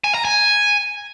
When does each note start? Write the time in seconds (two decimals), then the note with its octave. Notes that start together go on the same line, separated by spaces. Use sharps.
0.04 G#5
0.14 A#5
0.25 G#5